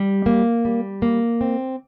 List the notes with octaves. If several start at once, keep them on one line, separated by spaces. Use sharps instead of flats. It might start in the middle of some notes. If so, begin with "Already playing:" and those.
Already playing: G3
A#3
G3
A#3
C4